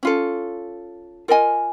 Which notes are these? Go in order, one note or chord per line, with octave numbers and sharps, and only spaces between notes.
C#4 F4 A4
F4 A#4 D#5 G#5